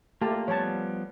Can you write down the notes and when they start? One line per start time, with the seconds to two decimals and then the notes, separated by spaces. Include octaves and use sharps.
0.21 A3 A#3 F4 G4 A5
0.48 F3 G3 B3 C#5 A5